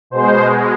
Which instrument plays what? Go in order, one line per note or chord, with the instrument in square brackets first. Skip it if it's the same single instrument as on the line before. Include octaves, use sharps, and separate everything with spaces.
[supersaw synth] B2 G#3 C5